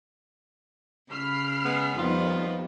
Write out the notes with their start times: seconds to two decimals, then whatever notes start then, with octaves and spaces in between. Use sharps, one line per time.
1.12 C#3 B5 F6 C7
1.65 G#3 B3
1.97 F2 C3 D#3 G3 B3 D#4 F4